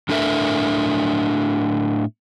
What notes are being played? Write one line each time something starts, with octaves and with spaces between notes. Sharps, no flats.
A2 D4 A4 A#4 E5